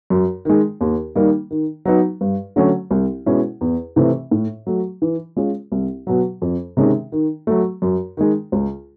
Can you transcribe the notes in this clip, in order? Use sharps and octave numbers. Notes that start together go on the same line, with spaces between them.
F#2
D#3 G#3
D#2
D#3 G3 A#3 D#4
D#3
F#3 B3 D#4
G2
D3 F#3 A3 C#4
C2
B2 G#3 C#4 E4
E2
C3 E3 A3 C4
A2
F#3 A3
E3
G#3 C#4 F4
C2
B2 F#3
F2
C3 D#3 G#3 C#4
D#3
F#3 A3
F#2
D#3 G#3
C#2